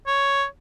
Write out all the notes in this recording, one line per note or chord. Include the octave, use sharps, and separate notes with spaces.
C#5